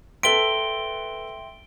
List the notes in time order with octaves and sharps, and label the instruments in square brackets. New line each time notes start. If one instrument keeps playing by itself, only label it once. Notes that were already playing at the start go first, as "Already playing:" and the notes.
[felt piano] A4 B4 B6 [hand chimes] E5 G5 C6 [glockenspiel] D7 G7